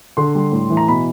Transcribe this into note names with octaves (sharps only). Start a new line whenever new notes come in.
D3 C6
G3
A2
E3
A#5
B2 B5